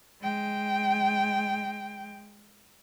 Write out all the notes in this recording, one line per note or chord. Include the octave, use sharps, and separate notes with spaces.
G#3 G5